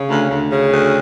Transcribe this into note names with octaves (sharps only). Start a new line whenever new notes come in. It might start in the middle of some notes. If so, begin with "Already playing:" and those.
Already playing: C#3
D2
D2
C#3
D2